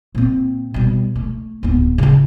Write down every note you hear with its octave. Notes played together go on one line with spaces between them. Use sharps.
A#2 C4
B2 G3
A3
D1 B3
C#3 F4